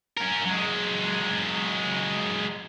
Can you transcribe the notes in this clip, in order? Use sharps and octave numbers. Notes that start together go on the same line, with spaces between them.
C#4 A#4
F#3 G#3